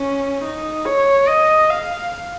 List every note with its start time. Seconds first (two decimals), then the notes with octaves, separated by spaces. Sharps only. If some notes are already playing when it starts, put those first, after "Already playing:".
Already playing: C#4
0.44 D#4
0.86 C#5
1.28 D#5
1.70 F5